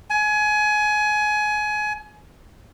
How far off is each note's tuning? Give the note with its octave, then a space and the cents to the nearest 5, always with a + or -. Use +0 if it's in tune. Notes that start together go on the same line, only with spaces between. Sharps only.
G#5 +25